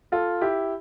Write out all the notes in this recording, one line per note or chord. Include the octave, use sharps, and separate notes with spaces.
F4 A4
E4 G4